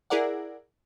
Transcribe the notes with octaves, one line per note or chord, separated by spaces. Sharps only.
E4 G#4 A#4 D5 F#5